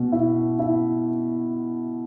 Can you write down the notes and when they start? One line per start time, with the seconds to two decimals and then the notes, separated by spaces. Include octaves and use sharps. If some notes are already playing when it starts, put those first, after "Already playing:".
Already playing: B2
0.12 E4
0.59 E4